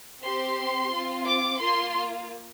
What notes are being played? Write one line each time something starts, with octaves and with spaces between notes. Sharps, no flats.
C4 G4 C6
C4 F4
D6
A#3 F4 C6